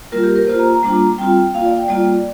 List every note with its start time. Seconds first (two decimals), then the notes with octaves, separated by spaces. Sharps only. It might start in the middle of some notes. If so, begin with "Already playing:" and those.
0.12 G3 A#3 F4 A#4
0.23 G4
0.36 A#4
0.47 A#3 F4 C5
0.59 A#5
0.71 A#5
0.83 G3 A#3 D4 F4
1.18 G3 C4 F4 G5
1.54 A#3 F4 F5
1.66 D5
1.77 G5
1.89 G3 A#3 F4 D5